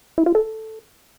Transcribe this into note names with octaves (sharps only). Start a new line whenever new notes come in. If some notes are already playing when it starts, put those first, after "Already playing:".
E4
F4
A4